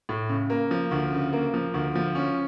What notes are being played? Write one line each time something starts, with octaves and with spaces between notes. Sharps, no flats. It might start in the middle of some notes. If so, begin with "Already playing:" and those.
A2
C#3
A#3
F3
D2
C#3
A#3
F3
D2
F3
C#4